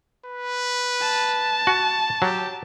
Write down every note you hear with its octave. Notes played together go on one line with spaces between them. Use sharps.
B4
A5
F#4
F#3 G4